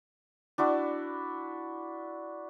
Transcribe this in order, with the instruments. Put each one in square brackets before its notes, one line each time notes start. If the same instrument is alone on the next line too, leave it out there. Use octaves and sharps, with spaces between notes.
[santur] D4 E4 F#4